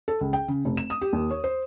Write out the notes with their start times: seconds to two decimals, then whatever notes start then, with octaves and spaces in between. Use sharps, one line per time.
0.08 A4
0.21 C#2
0.33 G5
0.48 C#3
0.65 F1
0.77 E7
0.90 D#6
1.01 G4
1.13 D#2
1.30 C#5
1.44 C5